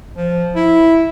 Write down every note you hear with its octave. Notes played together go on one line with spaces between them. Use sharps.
F3
E4